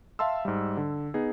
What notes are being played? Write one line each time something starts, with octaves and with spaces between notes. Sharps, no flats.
E5 F5 A5 C6 E6
G#2 G3
D3
B3 D#4 G#4